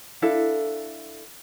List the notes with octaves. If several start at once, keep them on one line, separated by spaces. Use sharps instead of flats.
D4 E4 A4 F5